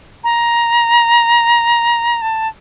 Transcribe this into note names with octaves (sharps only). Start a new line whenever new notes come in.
A#5
A5